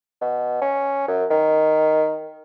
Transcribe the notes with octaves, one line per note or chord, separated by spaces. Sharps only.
B2
C#4
F#2
D#3